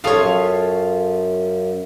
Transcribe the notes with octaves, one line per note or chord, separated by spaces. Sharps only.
F#2 F4 G4 A4 C#5 F5 D#6